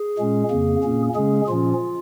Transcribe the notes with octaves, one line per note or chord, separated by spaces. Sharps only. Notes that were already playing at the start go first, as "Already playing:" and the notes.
Already playing: G#4
A#2 G#3 C#4
F2 C#3 A#3
A#2 A#3 C#4
C#3 G#3 C#4 G#4
A#2 F3 C#4 F4